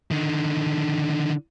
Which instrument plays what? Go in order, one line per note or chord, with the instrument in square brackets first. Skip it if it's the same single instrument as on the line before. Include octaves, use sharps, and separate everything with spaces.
[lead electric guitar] D3 D#3